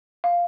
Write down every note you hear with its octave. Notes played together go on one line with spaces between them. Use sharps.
F5